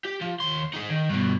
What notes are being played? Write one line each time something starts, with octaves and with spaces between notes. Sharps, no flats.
G4
F3
D#2 C6
D#4 G#4
D#3
G2 B2